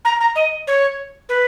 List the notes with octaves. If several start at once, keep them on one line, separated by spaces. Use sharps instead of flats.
A#5
A#5
D#5
C#5
B4